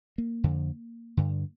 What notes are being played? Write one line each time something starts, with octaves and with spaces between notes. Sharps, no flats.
A#3
F2 D3
G2 D3